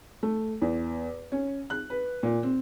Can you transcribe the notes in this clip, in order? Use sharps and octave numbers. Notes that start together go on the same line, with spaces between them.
A3
E2
C#4
F#6
B4
A#2
C4